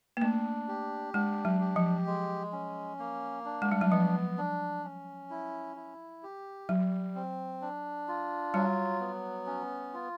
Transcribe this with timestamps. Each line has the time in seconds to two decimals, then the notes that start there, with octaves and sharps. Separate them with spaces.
0.17 A#3
0.22 A3 D4
0.68 G4
1.14 G#3 D4
1.45 F#3
1.60 G4
1.76 F3
2.06 G#3
2.52 C#4
2.99 A#3
3.45 D4
3.62 G#3
3.72 G3
3.81 F#3
3.91 F3 B3
4.38 D4
4.84 C#4
5.30 E4
5.76 E4
6.23 G4
6.69 F#3 G3
7.15 C4
7.62 D4
8.08 F4
8.54 F#3 G3
9.00 B3
9.47 C#4
9.93 F4